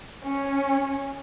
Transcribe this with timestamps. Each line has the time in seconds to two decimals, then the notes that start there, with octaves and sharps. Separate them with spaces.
0.24 C#4